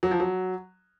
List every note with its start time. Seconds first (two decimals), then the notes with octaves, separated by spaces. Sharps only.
0.03 F#3
0.11 F3
0.20 F#3